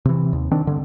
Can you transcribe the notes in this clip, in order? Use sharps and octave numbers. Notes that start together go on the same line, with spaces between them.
C3 E3
D#2
D#3 C4 D4
G2 D3